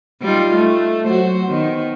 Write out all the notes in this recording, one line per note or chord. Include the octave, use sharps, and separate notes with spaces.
G3 D#4 F4
A3
F#3 F#4 C5
D#3 B3